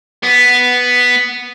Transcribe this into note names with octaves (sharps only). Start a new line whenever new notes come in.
B3